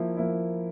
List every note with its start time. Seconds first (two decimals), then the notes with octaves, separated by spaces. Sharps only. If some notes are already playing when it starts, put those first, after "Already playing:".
Already playing: F3 A#3 E4
0.17 F3 A#3 E4